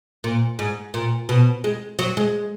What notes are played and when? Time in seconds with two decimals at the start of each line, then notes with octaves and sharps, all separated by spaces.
0.24 A#2
0.59 G#2
0.94 A#2
1.29 B2
1.64 G#3
1.99 F#3
2.17 G#3